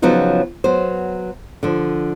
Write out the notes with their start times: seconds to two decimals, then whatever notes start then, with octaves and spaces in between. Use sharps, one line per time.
0.02 C#3 F3 F#3 B3 D#4 F4
0.64 F#3 B3 C5
1.63 D3 F3